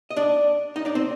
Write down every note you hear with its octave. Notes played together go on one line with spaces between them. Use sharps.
D#5
D4 D5
D#4 D#5
D4 D5
C4 C5